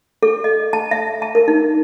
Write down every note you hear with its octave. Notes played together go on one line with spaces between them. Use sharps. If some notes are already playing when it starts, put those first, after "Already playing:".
A4
D#5
A5
E5
A5
A#4
D#4